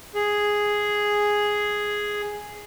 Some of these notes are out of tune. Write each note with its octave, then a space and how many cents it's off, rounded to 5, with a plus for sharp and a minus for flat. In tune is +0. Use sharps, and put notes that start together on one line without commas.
G#4 +0